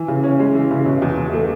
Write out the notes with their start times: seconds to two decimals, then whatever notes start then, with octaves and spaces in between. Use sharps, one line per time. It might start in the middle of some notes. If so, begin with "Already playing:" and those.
Already playing: E3
0.08 C#3
0.24 C#4
0.39 G#3
0.55 E3
0.71 C#3
0.86 B2
1.02 E2
1.18 E2
1.33 A3